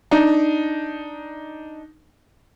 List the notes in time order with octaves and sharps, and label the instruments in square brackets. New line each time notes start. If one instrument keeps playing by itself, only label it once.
[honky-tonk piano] D4 D#4